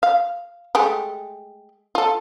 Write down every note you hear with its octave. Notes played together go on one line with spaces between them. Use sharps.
F5
G#3 A3 G4
F4 A4